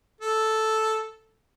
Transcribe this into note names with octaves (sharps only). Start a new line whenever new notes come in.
A4